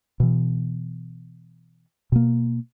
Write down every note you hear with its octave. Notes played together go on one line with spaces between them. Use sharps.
B2 E3
B2 A#3